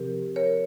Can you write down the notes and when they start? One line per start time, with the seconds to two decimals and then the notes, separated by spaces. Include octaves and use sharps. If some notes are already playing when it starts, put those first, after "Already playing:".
Already playing: C3 F3 C4 G4 A#4
0.36 A#4 C#5